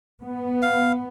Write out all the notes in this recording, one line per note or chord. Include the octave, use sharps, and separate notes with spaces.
B3
F5